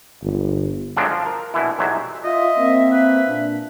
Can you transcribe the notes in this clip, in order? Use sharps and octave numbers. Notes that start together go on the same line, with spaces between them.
G1
F3 F#3 G#3 A3 C4 D4
F3
A#4
A#1 B2 E3 E4
B1 E2 C3 F#3 C5 E5
F4 D#5 E5
A#3 C4
B4
A#2 D4